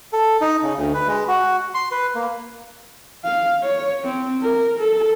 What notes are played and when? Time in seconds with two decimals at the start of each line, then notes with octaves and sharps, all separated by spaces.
0.13 A4
0.41 D#4
0.63 C#3
0.77 D2
0.94 B4
1.08 G#3
1.28 F#4
1.74 C6
1.91 B4
2.15 A#3
3.25 F5
3.64 C#5
4.04 C4
4.42 A#4
4.78 A4